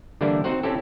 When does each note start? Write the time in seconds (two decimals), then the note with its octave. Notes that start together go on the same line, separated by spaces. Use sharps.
0.21 D3 E3 G3 A#3 D4 E4
0.44 C4 D#4 F#4 C5 F#5
0.63 C4 C#4 E4 G4 A4